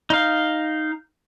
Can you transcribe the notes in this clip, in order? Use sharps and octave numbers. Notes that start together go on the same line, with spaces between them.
D#4 F5